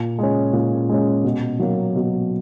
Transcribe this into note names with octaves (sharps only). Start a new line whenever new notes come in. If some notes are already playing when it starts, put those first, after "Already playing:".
Already playing: A#2
G#3 C#4
A#2
G#3 C#4
B2
F#3 A#3
B2